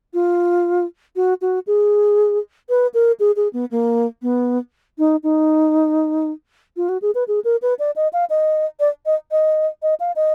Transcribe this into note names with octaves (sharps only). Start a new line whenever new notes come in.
F4
F#4
F#4
G#4
B4
A#4
G#4
G#4
B3
A#3
B3
D#4
D#4
F4
F#4
G#4
B4
G#4
A#4
B4
D5
D#5
F5
D#5
D5
D#5
D#5
D#5
F5
D#5